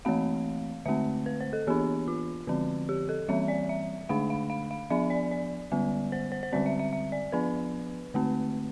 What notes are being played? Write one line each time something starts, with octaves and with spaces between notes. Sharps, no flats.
E3 A3 C4 F5
D3 A3 C4 E5
B4
C5
A4
E3 B3 D4 G4
F4
D3 F3 C4
G4
A4
E3 G3 C4 E5
D5
E5
D3 A3 D4 F5
F5
F5
F5
F3 B3 D4 E5
D5
D5
D3 G3 B3
C5
C5
C5
D3 G3 C4 D5
E5
E5
E5
D5
F3 B3 D4 B4
D3 A3 C4